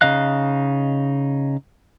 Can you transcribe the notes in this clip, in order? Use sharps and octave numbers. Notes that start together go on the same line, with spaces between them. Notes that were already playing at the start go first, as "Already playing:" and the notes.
C#3 D#4 D#5 F5 F#6